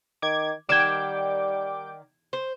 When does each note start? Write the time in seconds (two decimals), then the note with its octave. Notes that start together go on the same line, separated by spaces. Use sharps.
0.22 D#3 D6 G#6
0.69 D#3 G3 D5 F#5 G5 D6 G#6 E7
2.33 C5